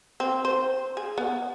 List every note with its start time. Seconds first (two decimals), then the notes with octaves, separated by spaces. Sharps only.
0.20 C4
0.45 C5
0.97 G#4
1.18 B3